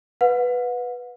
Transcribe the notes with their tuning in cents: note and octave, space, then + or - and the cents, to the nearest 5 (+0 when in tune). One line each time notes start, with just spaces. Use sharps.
B4 +0 F#5 -35